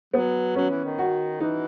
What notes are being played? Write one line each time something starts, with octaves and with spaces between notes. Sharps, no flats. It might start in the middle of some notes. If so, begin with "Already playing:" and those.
F#3 B3
F#3 C#4
E3
D#3
F#4
E3 D#4